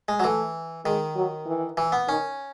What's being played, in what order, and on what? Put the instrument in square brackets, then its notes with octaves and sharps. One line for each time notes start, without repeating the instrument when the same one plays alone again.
[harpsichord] G#3
F#3
[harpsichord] E3 [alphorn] A3
[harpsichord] D#3 [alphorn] G#3
[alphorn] F#3
E3
[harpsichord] E3
B3
[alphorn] D#3 [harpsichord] C#4